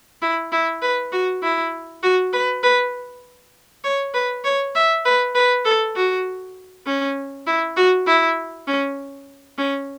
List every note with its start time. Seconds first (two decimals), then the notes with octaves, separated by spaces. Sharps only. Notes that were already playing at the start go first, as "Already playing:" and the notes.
0.22 E4
0.52 E4
0.82 B4
1.12 F#4
1.43 E4
2.03 F#4
2.33 B4
2.63 B4
3.84 C#5
4.14 B4
4.45 C#5
4.75 E5
5.05 B4
5.35 B4
5.65 A4
5.96 F#4
6.86 C#4
7.47 E4
7.77 F#4
8.07 E4
8.67 C#4
9.58 C#4